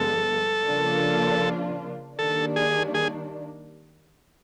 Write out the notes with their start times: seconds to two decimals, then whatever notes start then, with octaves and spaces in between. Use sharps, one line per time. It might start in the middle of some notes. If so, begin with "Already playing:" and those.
Already playing: G2 D3 F3 G#3 B3 A4
0.65 C#3 F3 A#3 D4 F4
2.17 D#3 G3 A#3 D4 A4
2.56 G#4
2.94 G#4